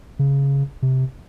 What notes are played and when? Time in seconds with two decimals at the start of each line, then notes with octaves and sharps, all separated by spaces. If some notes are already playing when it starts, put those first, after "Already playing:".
0.19 C#3
0.82 C3